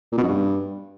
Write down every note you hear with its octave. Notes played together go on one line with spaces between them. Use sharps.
A#2
B2
F#2
G2